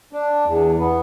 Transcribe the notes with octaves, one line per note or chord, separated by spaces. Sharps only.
D4
E2
B3